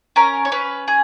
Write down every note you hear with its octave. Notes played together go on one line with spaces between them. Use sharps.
C#4 A#4
C#5
C#4 B4
G#4